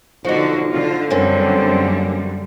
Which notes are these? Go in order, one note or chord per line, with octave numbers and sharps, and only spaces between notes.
B1 D3 F3 D#4 F#4
D3 F4 C5
F#2 C3 G3 A#3 C4 C#4